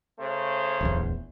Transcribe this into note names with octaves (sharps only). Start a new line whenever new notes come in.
C#3 A3 C5
D1 A#1 E2